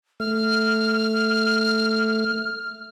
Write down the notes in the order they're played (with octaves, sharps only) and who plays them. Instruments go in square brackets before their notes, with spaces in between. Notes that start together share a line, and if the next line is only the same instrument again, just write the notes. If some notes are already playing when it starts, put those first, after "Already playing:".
[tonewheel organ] A3 [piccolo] F6